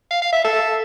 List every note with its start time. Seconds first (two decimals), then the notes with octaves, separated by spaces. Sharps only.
0.11 F5
0.22 F5
0.33 E5
0.44 A4